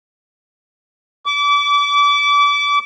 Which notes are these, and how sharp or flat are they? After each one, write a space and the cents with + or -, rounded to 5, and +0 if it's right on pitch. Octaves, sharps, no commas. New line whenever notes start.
D6 -30